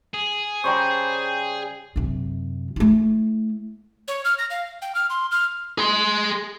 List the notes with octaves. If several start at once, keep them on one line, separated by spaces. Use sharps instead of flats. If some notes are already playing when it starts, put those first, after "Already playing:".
G#4
C#3 G3 C5 G5 A#5 C6 C#6
F#2 C3
A3 E4
C#5
F6
A#6
F5
G5
F6
C6
F6
G#4 C6